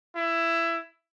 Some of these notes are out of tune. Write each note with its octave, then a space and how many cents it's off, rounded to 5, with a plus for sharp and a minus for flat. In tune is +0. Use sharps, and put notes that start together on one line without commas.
E4 +15